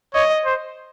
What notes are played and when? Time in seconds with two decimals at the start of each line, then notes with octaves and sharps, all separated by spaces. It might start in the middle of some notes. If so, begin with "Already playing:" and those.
0.14 C#5 D#5
0.45 C5